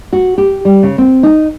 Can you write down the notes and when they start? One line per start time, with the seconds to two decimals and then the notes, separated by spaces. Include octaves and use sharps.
0.13 F#4
0.38 G4
0.65 G3
0.83 C#3
0.98 C4
1.23 D#4